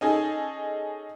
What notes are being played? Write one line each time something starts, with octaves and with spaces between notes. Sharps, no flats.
C#4 D#4 G#4 A4